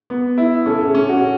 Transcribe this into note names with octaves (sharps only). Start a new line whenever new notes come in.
B3
E4
C#4 A4
G#4
C#4
F#4